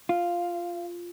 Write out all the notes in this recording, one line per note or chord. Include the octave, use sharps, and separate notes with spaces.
F4 F5